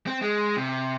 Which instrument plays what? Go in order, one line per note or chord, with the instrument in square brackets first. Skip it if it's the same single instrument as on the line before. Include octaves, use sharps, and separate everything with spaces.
[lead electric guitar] C4
G#3
C3